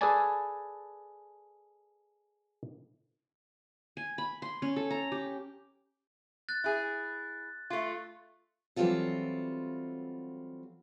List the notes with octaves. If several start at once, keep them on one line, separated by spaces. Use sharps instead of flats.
G#4 A4 B4 D5 G#5 A5
G#5
B5
C6
C#4
A4
A#5
G4
F#6 A6
E4 G#4
A3 F4
E3 F#3 G3 C4 F4 A4